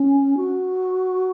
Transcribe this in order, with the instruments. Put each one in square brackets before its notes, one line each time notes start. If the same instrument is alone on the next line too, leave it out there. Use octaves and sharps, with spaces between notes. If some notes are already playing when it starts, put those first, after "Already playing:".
Already playing: [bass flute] C#4
F#4